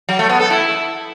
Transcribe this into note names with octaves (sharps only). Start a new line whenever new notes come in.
F#3
A3
B3
A4
E4